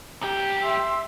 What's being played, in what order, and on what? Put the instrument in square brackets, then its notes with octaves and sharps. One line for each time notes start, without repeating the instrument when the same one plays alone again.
[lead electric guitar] B1 G4
[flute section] E5 C6 E6